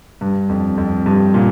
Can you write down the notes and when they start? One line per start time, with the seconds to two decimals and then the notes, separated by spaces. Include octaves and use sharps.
0.21 G2
0.49 F2
0.78 F2
1.06 G2
1.34 A#2